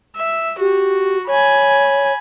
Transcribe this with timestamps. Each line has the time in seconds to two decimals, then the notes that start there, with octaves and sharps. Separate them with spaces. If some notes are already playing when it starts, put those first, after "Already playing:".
0.16 E5
0.60 F#4 G4
1.28 C#5 G#5 B5